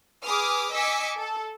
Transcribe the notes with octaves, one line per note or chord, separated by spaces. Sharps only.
G#4 B4 D6 D#6 F6
D#5 G#5 D6 E6 B6 C#7
A4